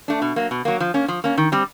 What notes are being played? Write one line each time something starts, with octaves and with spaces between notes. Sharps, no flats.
A3 D4
B2
F#3 A#3
B2
F#3 A#3
F3
A#3 C#4
F3
A#3 C#4
D#3
G3 C4